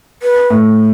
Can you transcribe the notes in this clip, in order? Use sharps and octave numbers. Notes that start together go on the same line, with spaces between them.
B4
A2